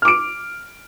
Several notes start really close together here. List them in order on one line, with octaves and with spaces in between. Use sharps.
F6 D6 D7